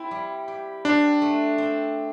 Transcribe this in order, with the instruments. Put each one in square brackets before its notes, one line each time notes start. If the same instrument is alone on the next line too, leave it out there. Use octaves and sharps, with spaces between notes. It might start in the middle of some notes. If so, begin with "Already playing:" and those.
Already playing: [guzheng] C4 G4 [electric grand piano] E4
[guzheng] G3
G4
[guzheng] C4 [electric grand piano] D4
[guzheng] A3
C4